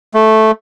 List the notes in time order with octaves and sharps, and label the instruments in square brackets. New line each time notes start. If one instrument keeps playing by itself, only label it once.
[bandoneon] A3